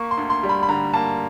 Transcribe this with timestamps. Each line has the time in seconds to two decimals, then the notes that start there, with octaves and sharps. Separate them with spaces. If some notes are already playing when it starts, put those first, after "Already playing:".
Already playing: A#3 C#6
0.11 C6
0.17 D2
0.30 C6
0.43 G3
0.49 B5
0.63 B5
0.69 D3 A#5
0.93 A#3 A5